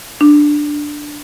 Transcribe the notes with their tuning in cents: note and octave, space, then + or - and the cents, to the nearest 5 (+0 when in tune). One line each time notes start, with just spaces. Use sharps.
D4 +5